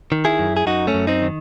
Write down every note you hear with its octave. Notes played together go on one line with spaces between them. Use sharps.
D#3
E4 G#4
F#2
G#4
F#2 D#4 F#4
A3 C#4
F#2
C4 D#4
D#3